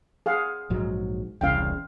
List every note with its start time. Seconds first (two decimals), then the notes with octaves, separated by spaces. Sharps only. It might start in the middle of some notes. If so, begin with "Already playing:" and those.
0.26 G#4 F5 F#5
0.70 A#1 G#2 F#3
1.41 E1 C2 C#3 F5 G5